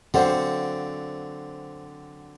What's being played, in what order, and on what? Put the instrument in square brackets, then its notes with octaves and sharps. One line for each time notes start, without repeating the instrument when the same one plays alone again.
[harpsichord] D3 F#3 C4 [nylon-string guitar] C5 F5 F#5